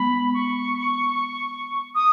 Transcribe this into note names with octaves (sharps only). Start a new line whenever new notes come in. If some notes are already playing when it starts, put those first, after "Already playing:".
Already playing: G#3 B3 B5
C#6
D#6